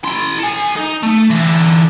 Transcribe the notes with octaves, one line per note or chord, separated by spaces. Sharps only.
E4 C6
A4 G#5
D#4
A3
D3 E3